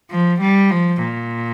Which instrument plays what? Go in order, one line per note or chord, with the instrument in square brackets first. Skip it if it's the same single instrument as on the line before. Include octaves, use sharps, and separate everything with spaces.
[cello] F3
G3
F3
A#2